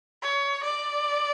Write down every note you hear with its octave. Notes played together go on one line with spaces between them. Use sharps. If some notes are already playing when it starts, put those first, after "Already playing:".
C#5
D5